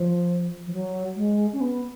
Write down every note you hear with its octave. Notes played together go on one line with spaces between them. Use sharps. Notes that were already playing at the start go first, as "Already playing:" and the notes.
Already playing: F3
F3
F#3
G#3
C#4
B3